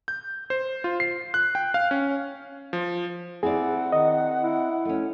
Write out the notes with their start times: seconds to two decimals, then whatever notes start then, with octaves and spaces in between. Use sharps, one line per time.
0.08 G6
0.50 C5
0.84 F4
1.00 C7
1.34 F#6
1.55 G5
1.74 F5
1.91 C#4
2.73 F3
3.43 C4 E4 G#4 D5 F#5
3.92 D#3 D#5
4.42 E4
4.85 A3 C#4